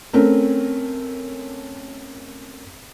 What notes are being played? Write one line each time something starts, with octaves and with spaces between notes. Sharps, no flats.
A3 C4 C#4 A#4